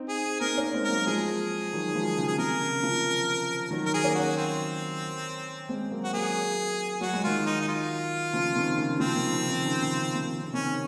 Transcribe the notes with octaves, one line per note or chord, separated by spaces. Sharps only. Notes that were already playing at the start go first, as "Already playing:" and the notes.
Already playing: C4 D#4
G#4
C4 D#4 A#4
A#3 C#4
G#3 C4
A#4
F#3 A#3
F3 G#3 G#4
D#3 F#3
F3 G#3
C#3
G#4
C3 A#4
C#3
C#3 F3
D#3 F#3
A#4
G#4
A#3 C#4
F#4
C4
G#3 C4
F#3 A#3
F#4
F#3 A#3 G#4
F#3 F#4
G#3
D#3 F#3 F4
D#4
D#4
F4
C#3 F3
C3 D#3
C#3
C#3 F3 C4
C3 D#3
C#3
C3 D#3
C#3
C#3
C3
D#3
C#3
C#3
C3 D#3 C#4